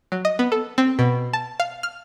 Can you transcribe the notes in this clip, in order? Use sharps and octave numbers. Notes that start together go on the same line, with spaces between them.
F#3
D#5
B3
A4
C4
B2
A5
F5
F6